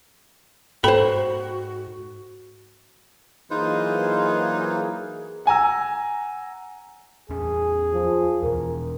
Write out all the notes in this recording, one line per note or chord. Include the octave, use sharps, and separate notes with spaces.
G#2 F#4 A4 C5 G5 B5
E3 F#3 A#3 D#4 F4 G#4 B4 C5
F#5 G#5 A#5 E6
E2 C#4 G#4
F3
E2 B2 A#4